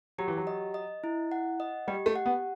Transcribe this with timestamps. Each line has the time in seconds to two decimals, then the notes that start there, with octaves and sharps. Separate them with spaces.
0.18 F#3 G4
0.28 E3
0.37 F#3
0.47 D#5
0.74 D#5
1.04 E4
1.32 F#5
1.60 D#5
1.88 G3 G4
2.06 A3
2.16 F#5
2.26 B3